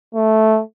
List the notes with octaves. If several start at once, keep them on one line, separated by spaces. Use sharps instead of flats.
A3